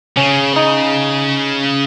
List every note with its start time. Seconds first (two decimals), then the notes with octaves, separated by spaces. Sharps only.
0.17 C#3 C#4
0.56 D#4